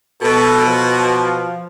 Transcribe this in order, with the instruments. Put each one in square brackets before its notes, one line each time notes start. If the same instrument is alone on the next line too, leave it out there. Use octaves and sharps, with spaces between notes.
[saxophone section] B2 [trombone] A4
[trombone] F3